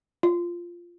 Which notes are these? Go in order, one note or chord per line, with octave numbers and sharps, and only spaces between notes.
F4